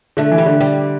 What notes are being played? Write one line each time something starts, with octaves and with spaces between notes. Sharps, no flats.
D3 A3
E3
G3
D3
G3